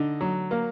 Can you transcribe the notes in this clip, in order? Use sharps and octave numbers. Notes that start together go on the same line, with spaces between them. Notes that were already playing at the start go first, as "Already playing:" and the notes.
Already playing: D3 D#4
F#3
A#3